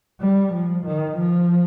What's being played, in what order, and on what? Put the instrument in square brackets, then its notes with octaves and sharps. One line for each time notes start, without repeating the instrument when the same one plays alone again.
[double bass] G3
F3
D#3
F3